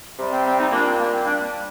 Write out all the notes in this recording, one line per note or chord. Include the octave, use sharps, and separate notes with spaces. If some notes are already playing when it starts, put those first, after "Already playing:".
C3 G3
C4
C4
C4 D#4
A#2 G3 A#3 D4
C4
A#3
C4
G3 A#3 D4